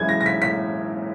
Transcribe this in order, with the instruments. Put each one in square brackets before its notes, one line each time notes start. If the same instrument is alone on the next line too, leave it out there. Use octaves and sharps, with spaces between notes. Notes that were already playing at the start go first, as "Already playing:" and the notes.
Already playing: [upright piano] F#2 E3 G#3 G#6
A#6
A#6
B6
B6